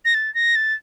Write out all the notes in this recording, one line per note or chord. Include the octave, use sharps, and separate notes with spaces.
A#6
A6
A#6
A6